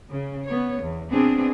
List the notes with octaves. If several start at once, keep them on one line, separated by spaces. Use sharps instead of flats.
C#3
B3 C#5
E2
B2 B3 C4 D4 G#4